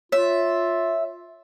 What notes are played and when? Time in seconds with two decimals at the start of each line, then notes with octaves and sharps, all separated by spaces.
0.12 F4 C#5 E5